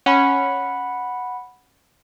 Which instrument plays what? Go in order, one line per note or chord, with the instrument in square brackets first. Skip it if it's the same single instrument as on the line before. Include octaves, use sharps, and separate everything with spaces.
[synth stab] C#4 [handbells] F#5 B5